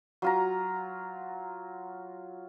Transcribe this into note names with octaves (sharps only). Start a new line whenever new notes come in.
F#3 F4 A#5